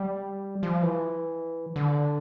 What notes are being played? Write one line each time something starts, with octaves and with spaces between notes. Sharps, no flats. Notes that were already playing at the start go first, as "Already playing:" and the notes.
Already playing: G3
F3
E3
D3